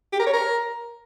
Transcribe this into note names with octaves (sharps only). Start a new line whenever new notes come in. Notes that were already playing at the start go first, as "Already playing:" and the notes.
G4
A#4
C#5
A#4